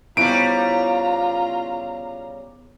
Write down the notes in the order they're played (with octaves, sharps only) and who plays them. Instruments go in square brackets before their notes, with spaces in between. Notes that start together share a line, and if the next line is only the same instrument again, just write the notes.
[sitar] C#3 G3 [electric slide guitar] B3 E4 C5 [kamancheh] F4 A#5 [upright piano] D7